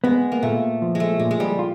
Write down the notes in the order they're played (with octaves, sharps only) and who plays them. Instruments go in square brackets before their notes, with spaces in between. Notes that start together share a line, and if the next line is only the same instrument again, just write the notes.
[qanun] G#3 [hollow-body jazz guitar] B3
[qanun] A#3
[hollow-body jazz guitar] A#2 [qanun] A3
[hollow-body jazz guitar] F3
[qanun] G#3
A3
[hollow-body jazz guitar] A#2 [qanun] G#3
[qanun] G#3
G3
[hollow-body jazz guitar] F4